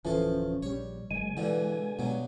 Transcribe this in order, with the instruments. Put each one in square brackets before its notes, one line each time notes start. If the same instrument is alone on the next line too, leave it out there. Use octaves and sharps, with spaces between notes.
[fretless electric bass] D1 F3 [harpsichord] E3 A4 [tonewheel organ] C#4
[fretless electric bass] A#1 G3 [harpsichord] C#5
[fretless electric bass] F#1 [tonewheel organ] G#3 G#5
[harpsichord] G2 B2 D3 [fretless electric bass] E3
[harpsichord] G2 F#3 [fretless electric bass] B2